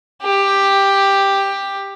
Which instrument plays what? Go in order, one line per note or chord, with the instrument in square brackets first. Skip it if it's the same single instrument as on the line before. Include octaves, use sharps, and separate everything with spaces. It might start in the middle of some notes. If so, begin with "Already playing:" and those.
[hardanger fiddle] G4